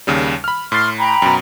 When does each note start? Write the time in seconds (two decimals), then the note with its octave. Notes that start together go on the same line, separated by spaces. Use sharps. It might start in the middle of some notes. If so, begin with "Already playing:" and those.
0.07 D#2 C#3 G3
0.44 B5 F6
0.72 A2 C6 F6 A6
0.99 G5 A#5 B5
1.22 F#2 B2